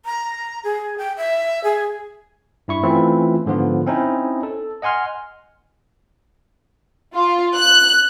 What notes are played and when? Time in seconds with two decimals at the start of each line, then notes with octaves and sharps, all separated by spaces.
0.05 A#5
0.64 G#4
0.98 G5
1.17 E5
1.64 G#4
2.68 G2 E4 C#6
2.83 E3 A3 C4 C#4 E4 F4
3.46 G#2 D3 F3 B3 F4
3.86 C4 C#4 D#4 E4
4.43 A4
4.82 D#5 F#5 G#5 C6 F6
7.14 F4
7.56 F#6